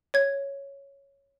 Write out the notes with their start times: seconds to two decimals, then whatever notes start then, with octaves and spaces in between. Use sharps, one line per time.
0.14 C#5 G#6